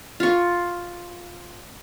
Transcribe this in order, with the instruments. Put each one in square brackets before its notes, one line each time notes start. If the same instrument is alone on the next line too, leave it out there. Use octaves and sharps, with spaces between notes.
[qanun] F4 C#6